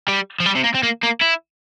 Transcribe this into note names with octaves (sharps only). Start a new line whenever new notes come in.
G3
F3
G3
C3
A#3
C4
A#3
A#3
E4